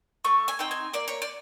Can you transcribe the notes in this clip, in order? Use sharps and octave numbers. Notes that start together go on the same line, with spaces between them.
A3 C#6
G#5
C4 D#4 G5
G#5
A#3 D5
C#5
D5